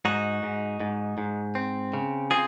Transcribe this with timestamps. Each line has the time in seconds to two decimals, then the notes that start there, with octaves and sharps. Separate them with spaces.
0.05 G#2 D#4 F#4
0.43 G#2
0.80 G#2
1.18 G#2
1.55 C4
1.93 C#3
2.31 C4 F4 G#4